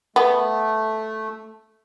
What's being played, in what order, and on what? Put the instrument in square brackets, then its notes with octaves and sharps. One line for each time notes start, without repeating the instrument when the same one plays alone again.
[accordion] A3 [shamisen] B3